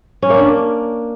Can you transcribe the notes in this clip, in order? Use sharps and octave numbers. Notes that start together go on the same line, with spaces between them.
C#4
A#3
D4